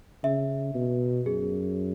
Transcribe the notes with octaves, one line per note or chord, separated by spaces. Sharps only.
C#3 E5
B2
F#2 G#4